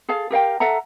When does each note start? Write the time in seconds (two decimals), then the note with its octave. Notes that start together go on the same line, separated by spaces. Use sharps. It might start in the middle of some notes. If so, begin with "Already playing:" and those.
0.09 G#4 A4 F5
0.30 G4 A#4 F5 G5
0.60 A4 E5 F#5 A#5